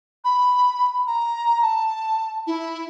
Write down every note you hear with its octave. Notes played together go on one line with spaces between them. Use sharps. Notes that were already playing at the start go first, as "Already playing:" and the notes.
B5
A#5
A5
E4